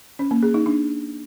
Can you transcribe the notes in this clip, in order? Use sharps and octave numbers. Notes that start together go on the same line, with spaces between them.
C#4
A#3
G#4
D#4
D4